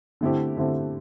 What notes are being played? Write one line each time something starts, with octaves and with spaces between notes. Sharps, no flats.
D3 A3 C4 E4 G4
D3 A3 C4 E4 G4